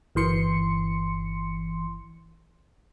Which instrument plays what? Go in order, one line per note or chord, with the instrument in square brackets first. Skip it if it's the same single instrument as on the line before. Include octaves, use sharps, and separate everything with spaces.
[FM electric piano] G1 E3 C6 C#7